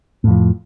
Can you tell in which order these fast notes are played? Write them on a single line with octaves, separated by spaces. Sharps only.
A2 F2 F3